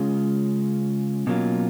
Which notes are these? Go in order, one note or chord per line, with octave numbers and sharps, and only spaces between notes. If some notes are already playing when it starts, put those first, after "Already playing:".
Already playing: C#3 G#3 C#4 F4
B2 F#3 A#3 C#4 F4